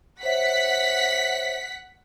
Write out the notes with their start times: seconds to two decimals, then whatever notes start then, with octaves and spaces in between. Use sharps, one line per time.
0.23 C5 C#5 E5 F#5 B6